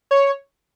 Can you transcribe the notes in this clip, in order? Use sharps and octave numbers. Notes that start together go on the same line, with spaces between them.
C#5